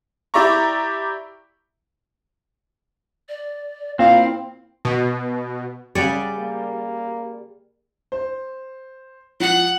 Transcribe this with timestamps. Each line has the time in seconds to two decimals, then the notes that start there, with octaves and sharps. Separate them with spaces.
0.34 E4 G4 D5 E5 A#5 C#6
3.29 D5
3.99 A#2 C4 E4 F5
4.85 B2
5.95 C#3 G3 G#4 C#5 D5 F#5
6.39 A#3
8.12 C5
9.40 F3 F#5